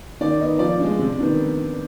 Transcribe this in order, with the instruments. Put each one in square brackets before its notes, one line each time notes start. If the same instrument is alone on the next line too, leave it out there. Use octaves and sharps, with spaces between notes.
[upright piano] D#3 D5
B3 D#4 D#5
F3 D5
G#3 D4
C3
D#3 B3 D4